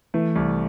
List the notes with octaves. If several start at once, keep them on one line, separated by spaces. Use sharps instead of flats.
E3 A3
C2